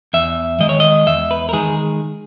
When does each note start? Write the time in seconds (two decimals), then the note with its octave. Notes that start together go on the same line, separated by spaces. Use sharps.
0.13 E2 E5
0.60 D#3 G#3 D#5
0.69 C#5
0.80 D#5
1.06 E2 E5
1.31 B4
1.49 A#4
1.53 D#3 G#3 G#4